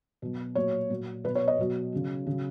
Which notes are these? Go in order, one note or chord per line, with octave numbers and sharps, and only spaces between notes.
B2 F#3
A#2 F#3 C#5
A#2 F#3
B2 F#3 B4
C#5
D#5
B2 F#3
C#3 F#3
C#3 F#3